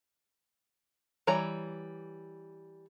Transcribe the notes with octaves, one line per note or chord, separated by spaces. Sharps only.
E3 G3 C#5 A#5